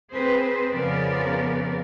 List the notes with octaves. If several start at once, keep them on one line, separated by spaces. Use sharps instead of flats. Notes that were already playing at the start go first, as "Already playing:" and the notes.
C4 G#4 B4 C5
F2 C#3 F3 B3 A#4 D5